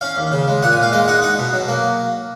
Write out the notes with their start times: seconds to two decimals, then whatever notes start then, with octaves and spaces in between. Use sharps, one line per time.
0.01 C#4 F5
0.17 D#2
0.32 C#3
0.48 G#3
0.62 A#2 F#5
0.72 G#5
0.77 A#2
0.83 F5
0.93 G#3 D#5
1.08 D#4 F#5
1.22 D#4 F#5
1.38 B2
1.54 F#3
1.68 A#3